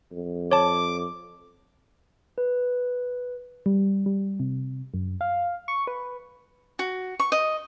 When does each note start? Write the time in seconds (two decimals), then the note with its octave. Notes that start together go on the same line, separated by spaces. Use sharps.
0.12 F2
0.51 C#5 A5 D6
2.38 B4
3.66 G3
4.06 G3
4.40 C3
4.94 F#2
5.21 F5
5.68 C#6
5.87 B4
6.79 F#4
7.19 C#6
7.32 D#5